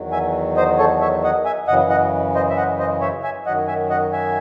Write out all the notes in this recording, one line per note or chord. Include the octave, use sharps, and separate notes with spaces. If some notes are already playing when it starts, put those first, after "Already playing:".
Already playing: E2 D#3 F#3
E5 G#5
C5 D#5
A4 C#5
C#5 E5
D#5 F#5
E5 G#5
F#2 C#3 E3 D#5 F#5
D#5 F#5
C5 D#5
E5
D#5 F#5
C5 D#5
C#5 E5
E5 G#5
F#2 D#3 F#3 D#5 F#5
E5 G#5
D#5 F#5
E5 G#5